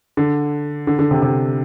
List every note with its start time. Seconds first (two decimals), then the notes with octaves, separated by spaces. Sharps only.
0.17 D3
0.87 D3
0.99 D3
1.11 C3
1.22 C3